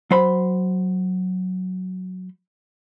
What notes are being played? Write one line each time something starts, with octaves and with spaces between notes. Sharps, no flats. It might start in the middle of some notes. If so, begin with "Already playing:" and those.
F#3 C5 B5